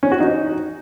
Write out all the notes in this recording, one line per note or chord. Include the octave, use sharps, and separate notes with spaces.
C#4
F#4
D#4